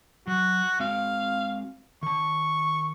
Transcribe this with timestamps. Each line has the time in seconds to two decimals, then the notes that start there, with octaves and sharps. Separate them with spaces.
0.27 F#3 F#4
0.80 G#3 C4 F#4 F5
2.03 D#3 A5 C#6